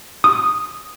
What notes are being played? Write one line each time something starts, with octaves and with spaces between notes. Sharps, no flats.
D#6